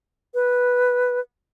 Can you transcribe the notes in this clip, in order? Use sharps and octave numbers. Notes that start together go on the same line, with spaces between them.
B4